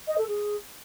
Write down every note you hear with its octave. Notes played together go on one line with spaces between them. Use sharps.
D#5
A4
G#4